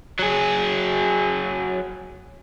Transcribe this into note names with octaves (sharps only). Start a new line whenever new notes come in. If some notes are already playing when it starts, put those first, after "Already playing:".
F#3 G#4